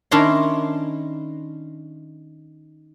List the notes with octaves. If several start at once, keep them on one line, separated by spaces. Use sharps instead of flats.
D#3 C#4 D4 E4 A#5 C6